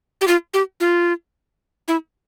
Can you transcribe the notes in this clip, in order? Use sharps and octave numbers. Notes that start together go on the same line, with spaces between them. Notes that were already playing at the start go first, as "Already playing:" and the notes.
G4
F4
G4
F4
E4